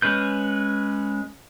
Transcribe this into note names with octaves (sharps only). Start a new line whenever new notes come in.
G#3 C#4 B4 G6